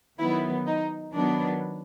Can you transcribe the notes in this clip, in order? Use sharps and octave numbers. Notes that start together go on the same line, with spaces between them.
D#3 F#3 B3 E4
D#4
D#3 F#3 B3 D4